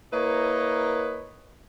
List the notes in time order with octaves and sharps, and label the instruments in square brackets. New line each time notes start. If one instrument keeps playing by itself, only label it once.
[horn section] A#3 E4 A#4 B4 C#5 D#5